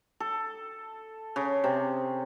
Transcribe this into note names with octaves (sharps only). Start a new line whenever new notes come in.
A4
C#3
C3